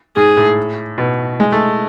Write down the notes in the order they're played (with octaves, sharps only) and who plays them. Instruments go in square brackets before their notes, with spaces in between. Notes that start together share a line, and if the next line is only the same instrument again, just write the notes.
[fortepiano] G#2 [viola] G#4
[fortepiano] A2
B2
G#3
A3